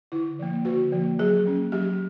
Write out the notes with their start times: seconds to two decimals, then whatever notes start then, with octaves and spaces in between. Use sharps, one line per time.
0.12 D3 E4
0.39 F3 A#3
0.65 D3 F#4
0.92 F3 A#3
1.19 F#3 G#4
1.46 A#3 C#4
1.72 F#3 G4